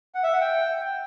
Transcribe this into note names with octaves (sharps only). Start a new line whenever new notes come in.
F#5
E5
F#5
G5